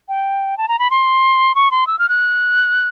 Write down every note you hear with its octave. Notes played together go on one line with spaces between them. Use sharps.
G5
A5
A#5
B5
C6
C#6
C6
E6
F6
F#6